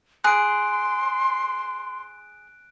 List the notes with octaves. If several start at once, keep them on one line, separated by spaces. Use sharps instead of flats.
G#4 C6 F#6 D7